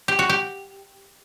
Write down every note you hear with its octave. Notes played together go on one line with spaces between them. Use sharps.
G4
F#4
G4